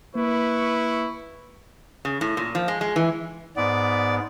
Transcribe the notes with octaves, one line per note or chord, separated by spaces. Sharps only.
A#3 E4 B4 C#6
C#3
A2
A#2
F3
G#3
G#3
E3
G#2 B3 D5